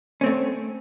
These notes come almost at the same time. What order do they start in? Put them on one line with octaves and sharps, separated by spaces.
C#4 C4 A3